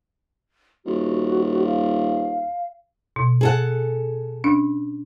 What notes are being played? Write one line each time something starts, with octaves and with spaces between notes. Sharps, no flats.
D#1 F#4
F5
B2
G#4 A4 F#5
C#4 D4